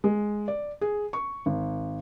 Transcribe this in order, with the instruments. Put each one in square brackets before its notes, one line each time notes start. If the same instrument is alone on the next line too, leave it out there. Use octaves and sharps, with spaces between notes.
[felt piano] G#3
D5
G#4
C#6
G#1